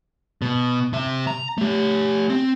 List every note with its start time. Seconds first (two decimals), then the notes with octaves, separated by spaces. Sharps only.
0.42 B2
0.93 C3 E5
1.27 A#5
1.58 A3 G4
2.30 C4